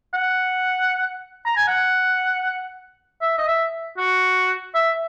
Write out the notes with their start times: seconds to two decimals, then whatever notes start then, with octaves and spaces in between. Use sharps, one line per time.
0.14 F#5
1.46 A#5
1.56 G#5
1.68 F#5
3.21 E5
3.38 D#5
3.47 E5
3.98 F#4
4.74 E5